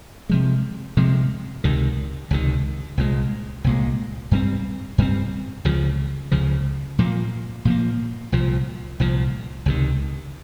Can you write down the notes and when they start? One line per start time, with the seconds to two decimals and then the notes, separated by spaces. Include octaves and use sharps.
0.29 C3 F3 G#3
0.97 C3 F3 G#3
1.64 C#2 C3 D#3
2.31 C#2 C3 D#3
2.97 C2 A#2 G#3
3.64 C2 A#2 G#3
4.31 G2 G3 C4
4.98 G2 G3 C4
5.65 C#2 C#3 F3
6.31 C#2 C#3 F3
6.99 A#2 F3 A#3
7.65 A#2 F3 A#3
8.32 C2 A#2 F3
9.00 C2 A#2 F3
9.66 C#2 C3 D#3